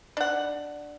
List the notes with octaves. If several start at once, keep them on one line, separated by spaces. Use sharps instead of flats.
D4 F#5